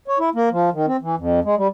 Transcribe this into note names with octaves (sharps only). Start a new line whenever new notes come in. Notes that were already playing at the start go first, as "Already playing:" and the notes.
C#5
E4
A#3
F3
D#3
C4
E3
F2
G#3
G3